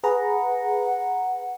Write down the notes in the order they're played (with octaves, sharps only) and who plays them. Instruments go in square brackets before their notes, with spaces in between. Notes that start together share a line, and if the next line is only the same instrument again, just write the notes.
[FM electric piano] G#4 B4 A#5 [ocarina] F#5